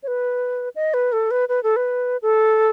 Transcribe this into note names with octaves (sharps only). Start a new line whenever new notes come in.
C#5
B4
D#5
B4
A4
B4
B4
A4
B4
A4